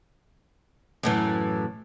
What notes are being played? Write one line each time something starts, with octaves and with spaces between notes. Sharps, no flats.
F#2 A2 E3